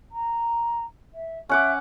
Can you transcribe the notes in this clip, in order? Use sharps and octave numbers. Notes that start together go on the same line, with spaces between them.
A#5
E5
C#4 E5 F#5 D6